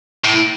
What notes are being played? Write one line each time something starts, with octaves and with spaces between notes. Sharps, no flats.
A2